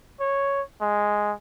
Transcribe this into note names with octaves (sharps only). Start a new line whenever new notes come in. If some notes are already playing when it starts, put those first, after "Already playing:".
C#5
G#3